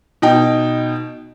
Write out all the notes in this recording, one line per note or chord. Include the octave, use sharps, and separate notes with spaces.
B2 D#4 G5